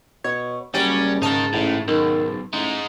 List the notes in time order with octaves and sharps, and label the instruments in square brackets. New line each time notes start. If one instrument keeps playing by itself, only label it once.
[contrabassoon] B2 [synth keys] C#5
[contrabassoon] F#1 [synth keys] F#3 G3 D5 [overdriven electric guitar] C#4
[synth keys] G#2 C#3 A5 [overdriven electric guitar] D#4 A#4
[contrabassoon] A1 [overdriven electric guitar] A2
[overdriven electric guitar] B1 [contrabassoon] D#3
[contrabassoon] A1 [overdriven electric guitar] G#3 D#4